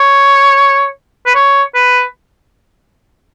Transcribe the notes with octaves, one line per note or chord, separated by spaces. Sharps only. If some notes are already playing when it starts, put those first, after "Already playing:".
Already playing: C#5
B4
C#5
B4